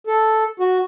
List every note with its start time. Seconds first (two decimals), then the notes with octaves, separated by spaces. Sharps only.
0.07 A4
0.60 F#4